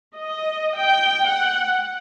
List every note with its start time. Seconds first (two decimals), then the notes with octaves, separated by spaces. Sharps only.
0.16 D#5
0.78 G5
1.28 F#5